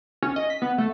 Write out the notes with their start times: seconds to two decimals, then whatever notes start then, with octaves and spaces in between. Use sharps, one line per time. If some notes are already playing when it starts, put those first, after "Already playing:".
0.22 C#4
0.36 D#5
0.50 B6
0.62 B3
0.78 A3